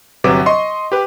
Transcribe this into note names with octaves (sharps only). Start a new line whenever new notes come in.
G1 C3 F#3 B4 D6
D#5 C6 C#6
G4 B4